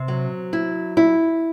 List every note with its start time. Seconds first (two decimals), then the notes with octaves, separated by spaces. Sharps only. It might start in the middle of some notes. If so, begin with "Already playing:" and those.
Already playing: C3 C4
0.08 F#3
0.53 E4
0.97 E4